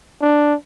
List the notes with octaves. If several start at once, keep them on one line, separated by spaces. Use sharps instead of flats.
D4